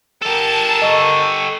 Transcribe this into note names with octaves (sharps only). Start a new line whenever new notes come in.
G4 A4 A#4 A5
D#5 C#6 E6